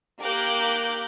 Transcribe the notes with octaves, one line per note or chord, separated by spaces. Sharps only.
A#3 G4 A#4 D6 F#6 G6